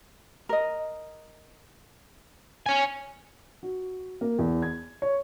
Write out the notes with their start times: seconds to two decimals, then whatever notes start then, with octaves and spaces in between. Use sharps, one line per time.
0.49 A#4 D#5
2.66 C#5 G#5
3.63 F#4
4.21 A#3
4.39 E2
4.62 G#6
5.02 C#5